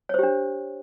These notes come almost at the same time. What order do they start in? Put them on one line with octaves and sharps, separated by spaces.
C#5 C5 G4 D4